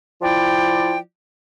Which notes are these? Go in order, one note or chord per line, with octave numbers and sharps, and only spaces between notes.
F3 E4 D5 G5